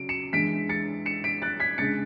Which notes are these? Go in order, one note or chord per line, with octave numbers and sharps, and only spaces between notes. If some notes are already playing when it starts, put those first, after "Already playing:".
Already playing: C#3 F#3 D7
C#7 E7
E3 G#3 D4 B6 D7
A6 C#7
C#7 E7
B6 D7
F#6 A6
G#6 B6
C#3 G#3 D4 A6 C#7